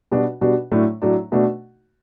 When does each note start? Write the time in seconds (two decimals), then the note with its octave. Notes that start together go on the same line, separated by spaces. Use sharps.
0.11 B2 G3 D4 F#4
0.41 B2 G3 D4 F#4
0.71 A2 F#3 A3 D4
1.02 A2 F#3 A3 D4
1.32 B2 A3 D4 F#4